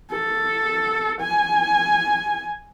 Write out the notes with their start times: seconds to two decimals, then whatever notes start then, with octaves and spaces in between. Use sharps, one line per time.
0.11 A4
1.21 G#5